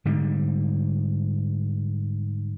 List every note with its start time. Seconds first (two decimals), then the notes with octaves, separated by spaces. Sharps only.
0.05 G#2 D3 G3